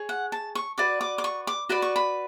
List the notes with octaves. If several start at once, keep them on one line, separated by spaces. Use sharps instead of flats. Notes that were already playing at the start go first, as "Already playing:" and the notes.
Already playing: G#4 C#5
F#5
A5
C#6
F#4 B4 D5 D6
D6
D6
C#6
D6
F#4 B4 D5 B5
C#6
B5